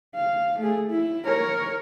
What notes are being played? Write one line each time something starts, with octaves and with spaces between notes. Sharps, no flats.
F5
A3 G#4
E4
A#4 C#5